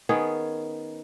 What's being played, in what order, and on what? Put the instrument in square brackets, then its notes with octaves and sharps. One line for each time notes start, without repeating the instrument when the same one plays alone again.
[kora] D#3 B3 C#4 G#4